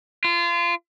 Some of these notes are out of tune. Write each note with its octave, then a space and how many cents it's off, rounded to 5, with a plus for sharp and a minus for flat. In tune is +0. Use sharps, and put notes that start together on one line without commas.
F4 -25